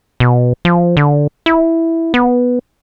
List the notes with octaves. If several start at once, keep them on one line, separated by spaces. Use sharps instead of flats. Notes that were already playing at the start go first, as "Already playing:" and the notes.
B2
F3
D3
E4
B3